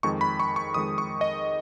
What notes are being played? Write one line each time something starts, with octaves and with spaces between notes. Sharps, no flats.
F2 D#3 G#3 C#6
B5
C#6
C#6
F2 D#3 G#3 D#6
C#6
D#5